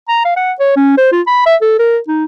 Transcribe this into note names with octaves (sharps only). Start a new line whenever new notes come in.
A#5
F5
F#5
C#5
C#4
C5
F4
B5
E5
A4
A#4
D#4